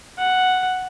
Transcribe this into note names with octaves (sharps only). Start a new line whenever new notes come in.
F#5